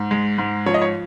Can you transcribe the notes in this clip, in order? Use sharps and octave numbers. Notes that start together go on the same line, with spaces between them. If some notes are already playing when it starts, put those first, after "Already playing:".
Already playing: G#2
G#3
G#2
F3 C#5
D#5
C#5